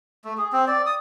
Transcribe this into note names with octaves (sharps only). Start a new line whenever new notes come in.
A3
G#4
C4
D5
D#6